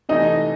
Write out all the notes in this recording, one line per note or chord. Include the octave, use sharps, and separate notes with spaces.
C3 E3 A3 D#4 D#5